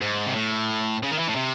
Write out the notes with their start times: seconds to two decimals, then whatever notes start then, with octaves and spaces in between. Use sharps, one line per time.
0.01 G#2
0.27 C3
0.35 A2
1.03 C#3
1.11 D#3
1.19 E3
1.28 A2
1.36 C3